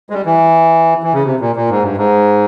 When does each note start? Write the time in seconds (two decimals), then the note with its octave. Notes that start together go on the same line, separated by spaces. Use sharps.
0.10 G#3
0.13 G3
0.25 E3
1.03 E3
1.13 C#3
1.24 C3
1.40 A#2
1.56 A#2
1.70 G#2
1.83 G2
1.97 G#2